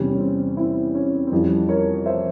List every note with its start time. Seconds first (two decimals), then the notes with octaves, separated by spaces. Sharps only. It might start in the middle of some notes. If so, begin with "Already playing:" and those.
Already playing: E2 C3 G3 C#4
0.13 C#4
0.20 C4
0.57 C4 E4
0.95 C#4
1.27 C4
1.31 F2 E3 G3 C#4
1.69 A#4 C#5
2.06 C5 E5